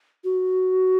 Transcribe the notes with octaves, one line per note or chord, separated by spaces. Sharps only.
F#4